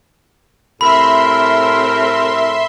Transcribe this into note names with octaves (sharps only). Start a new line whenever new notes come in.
A2 C3 A#4 E5 B5 C6